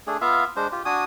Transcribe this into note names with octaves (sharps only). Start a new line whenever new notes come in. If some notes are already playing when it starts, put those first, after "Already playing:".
A3 D4 G#4
B3 F4 E5 F5
G#3 D4 C5
F4 G4
D4 F#4 G#5 D#6